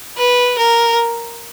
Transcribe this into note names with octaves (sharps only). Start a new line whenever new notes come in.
B4
A#4